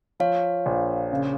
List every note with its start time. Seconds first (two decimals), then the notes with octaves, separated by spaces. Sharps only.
0.20 F3 C#5 F5
0.66 A#1
1.11 C#3